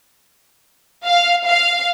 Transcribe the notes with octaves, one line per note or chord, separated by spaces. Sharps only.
F5
F5